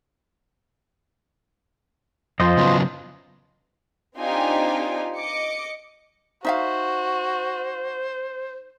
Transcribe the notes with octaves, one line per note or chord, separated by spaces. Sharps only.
F2 F4 C5 D#5
C#3 F#3 B3
C4 D4 D#4 F4 G4 G#5
D#5 D6 C#7
D#4 F#4 C5 E5 F5